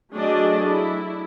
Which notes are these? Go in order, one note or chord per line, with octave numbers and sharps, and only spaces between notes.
F#3 A3 D4 G#4 D5 D#5
E4